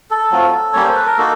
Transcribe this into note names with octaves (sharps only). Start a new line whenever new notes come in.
A4
F#3 A3 C4 F4
G3 A#3 C#4 C#5
C5
B4
A#4
A#3 D#4 F#4 A4